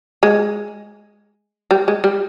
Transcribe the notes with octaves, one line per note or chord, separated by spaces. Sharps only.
G#3
G3
G#3
G3